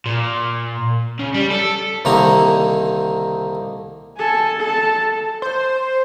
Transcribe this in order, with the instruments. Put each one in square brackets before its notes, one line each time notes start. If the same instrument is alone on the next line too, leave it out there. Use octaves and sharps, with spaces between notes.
[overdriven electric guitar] A#2
C#3
G3
A4
[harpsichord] C2 D3 D#3 A#3 C4 A#5
[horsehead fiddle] A4 G#5
A4 A5
[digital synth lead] C5